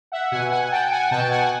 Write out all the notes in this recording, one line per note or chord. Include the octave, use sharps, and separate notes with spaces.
E5 F#5
B2 F#5 G#5
F#5 G#5
G#5
G5 A5
F#5 G#5
B2 G5 A5
F#5 G#5